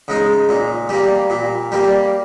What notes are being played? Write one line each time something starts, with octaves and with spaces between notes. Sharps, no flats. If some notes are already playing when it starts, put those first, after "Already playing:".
C#3 G#3 D#4
A#2
G3 A#3
A#2
G3 A#3